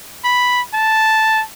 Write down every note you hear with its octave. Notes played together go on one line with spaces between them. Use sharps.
B5
A5